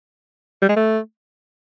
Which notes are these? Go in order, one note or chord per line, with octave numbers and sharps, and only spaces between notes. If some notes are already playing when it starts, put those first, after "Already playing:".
G3
G#3
A3